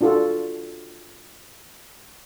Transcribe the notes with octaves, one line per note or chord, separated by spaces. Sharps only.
D4 F4 F#4 A4